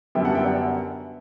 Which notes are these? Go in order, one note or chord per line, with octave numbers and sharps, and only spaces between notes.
F#2 D3 G3 B3 E5 G5
F#5 A5
E5 G5
D5 F#5